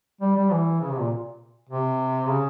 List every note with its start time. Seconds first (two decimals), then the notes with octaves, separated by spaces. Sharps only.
0.21 G3
0.36 G3
0.51 E3
0.80 C#3
0.91 C3
1.00 A#2
1.69 C3
2.29 C#3